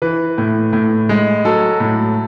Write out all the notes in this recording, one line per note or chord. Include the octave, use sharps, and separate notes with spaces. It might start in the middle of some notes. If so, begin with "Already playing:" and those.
E3 B4
A2
A2
G#3
F#3 A4
A2